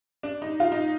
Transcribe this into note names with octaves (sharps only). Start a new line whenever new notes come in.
D4
D#4
F4
D#4